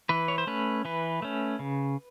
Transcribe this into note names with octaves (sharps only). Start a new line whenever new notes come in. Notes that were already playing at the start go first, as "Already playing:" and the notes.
E3 B4
C#5
C5
A3 C#4 B4
E3 B4
A3 C#4
C#3